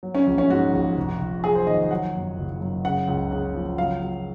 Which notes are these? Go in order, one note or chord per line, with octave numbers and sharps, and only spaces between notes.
F#3
C#4
A#1
C#4
G#2 F#4
A#1
F1
F1
F#3 G#4
C5
D#3 D#5
F#3 F#5
F#2
F#1
F#2
C#3 F#5
C#2
C#3
F3
F#3 F5
F#3